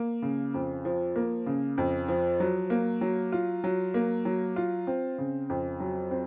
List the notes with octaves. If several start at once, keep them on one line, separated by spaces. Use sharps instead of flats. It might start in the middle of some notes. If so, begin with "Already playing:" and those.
Already playing: A#3
C#3
F2
F3
A#3
C#3
F2
F3
F#3
A#3
F#3
F4
F#3
A#3
F#3
F4
C4
C#3
F2
F#3
C4